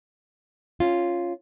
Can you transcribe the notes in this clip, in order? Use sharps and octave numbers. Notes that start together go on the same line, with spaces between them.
C#4 F4